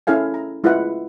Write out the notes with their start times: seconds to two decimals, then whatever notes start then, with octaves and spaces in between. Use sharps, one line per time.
0.07 C#4 E4 A4 F5 G#5
0.34 A#5
0.64 G#3 E4 F4 B4 D#5 F#5